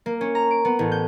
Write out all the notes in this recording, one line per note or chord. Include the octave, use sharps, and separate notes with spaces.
A#3
C#4
A#5
D7
B3
A1
G6